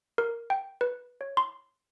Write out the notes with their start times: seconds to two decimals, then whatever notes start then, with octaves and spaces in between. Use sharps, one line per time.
0.18 A#4
0.50 G5
0.81 B4
1.21 C#5
1.37 C6